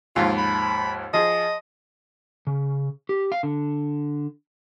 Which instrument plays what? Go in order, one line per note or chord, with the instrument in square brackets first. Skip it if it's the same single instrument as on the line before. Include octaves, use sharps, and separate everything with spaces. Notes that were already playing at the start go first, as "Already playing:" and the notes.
[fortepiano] D#2 G#2 F3 [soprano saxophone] F4
[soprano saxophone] B5
[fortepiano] F3 G#4 [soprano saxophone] D#5
[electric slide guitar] C#3
G4
F5
D3